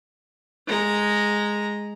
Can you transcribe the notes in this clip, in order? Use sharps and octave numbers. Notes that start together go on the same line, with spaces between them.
G#3 A#5